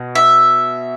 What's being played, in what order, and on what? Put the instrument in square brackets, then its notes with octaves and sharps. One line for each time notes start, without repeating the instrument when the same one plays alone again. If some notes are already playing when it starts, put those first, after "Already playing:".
Already playing: [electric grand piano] B2
[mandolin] E5